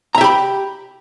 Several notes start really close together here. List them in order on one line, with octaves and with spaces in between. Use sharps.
A#5 E5 G4 B5